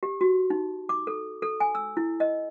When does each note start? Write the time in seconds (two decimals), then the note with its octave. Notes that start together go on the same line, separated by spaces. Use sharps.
0.03 G4
0.21 F#4
0.50 D#4
0.89 D6
1.07 A4
1.42 A4
1.60 G#5
1.75 E6
1.97 E4
2.20 D#5